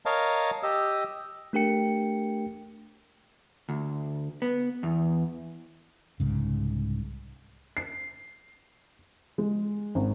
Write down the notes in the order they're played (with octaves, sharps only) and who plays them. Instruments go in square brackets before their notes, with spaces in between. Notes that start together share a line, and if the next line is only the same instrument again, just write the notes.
[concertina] A#4 C#5 D#5 F5 A5
G4 D#5 E6
[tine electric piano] A3 D4 G4 A#4 G5 C#7
[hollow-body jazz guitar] D2
B3
E2
[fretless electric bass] C2 G#2 C#3
[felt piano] C7
G#3
G#1